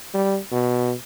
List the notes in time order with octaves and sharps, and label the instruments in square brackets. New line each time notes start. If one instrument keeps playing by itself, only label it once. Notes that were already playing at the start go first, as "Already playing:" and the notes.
[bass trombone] G3
B2